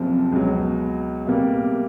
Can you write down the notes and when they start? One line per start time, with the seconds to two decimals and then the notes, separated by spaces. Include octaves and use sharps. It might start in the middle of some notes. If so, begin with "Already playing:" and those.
Already playing: F#1 F2 C3 F3
0.32 C#2 B2 F#3
1.27 C2 B2 G3 A#3